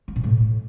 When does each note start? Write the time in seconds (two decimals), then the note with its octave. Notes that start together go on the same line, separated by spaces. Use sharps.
0.08 A#3
0.16 A#2
0.24 A2